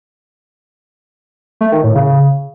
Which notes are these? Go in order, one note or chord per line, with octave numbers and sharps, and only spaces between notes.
A3
D#3
A2
C#3